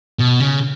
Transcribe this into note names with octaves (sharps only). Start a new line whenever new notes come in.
B2
C#3